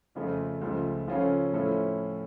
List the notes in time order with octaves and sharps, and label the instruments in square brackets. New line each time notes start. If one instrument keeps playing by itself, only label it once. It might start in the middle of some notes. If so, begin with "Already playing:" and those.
[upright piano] F2 C#3 F3 A3
C#2 C#3 F3 A3
C#3 F3 C#4 F4 A4
A2 F3 C#4 E4 A4